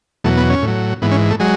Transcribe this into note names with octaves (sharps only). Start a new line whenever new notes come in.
E2 B2 F#3 A3
B3
C#4
A2
F#3
G#2 E3 B3
C#4
A3
F#3 G#3